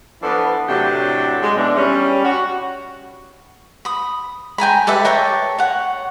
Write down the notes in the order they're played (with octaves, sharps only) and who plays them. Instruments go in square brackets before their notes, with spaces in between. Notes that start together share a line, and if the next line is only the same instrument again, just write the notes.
[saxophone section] E3 F3 B3 D4 A4
A2 C3 F#3 D4 G4 A4
G#3
B2 E3 D4
G3 C#4
F#4
[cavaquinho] B5 D#6
G5 G#5 A#5 B5
G4 A4 B4 E5
A#4 C#5 G5 A5
C#5 F#5